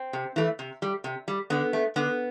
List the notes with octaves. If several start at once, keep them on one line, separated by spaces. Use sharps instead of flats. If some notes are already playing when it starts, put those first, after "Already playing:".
Already playing: C4
C3
E3 A3
C3
G3
C3
G3
D3 B3
A3
D3 B3